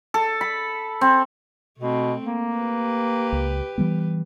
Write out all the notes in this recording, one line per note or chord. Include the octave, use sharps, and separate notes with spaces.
A4
B5
C4
B2 A3 C4
A#3
G4 B4
C#2
E3 G3 B3